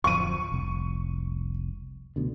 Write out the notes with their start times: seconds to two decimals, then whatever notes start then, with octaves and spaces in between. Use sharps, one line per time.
0.04 D1 F2 F3 C#6 D#7
0.52 F1 C2
2.16 D2 B2 D3